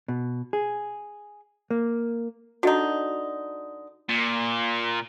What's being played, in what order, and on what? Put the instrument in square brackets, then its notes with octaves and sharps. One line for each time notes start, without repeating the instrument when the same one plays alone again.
[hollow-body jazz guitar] B2
G#4
A#3
[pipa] D3 D#4 [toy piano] F#4 D#5
[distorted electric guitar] A#2